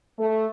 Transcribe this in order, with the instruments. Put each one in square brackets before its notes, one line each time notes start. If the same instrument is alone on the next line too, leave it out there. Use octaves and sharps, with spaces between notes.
[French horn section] A3